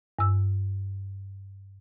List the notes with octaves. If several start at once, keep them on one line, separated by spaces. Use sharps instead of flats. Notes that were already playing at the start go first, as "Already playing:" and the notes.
G2 E6